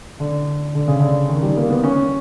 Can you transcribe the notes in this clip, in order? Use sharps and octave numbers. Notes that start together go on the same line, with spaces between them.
D3
D3
C#3
D3
D#3
G3
A#3
B3
C#4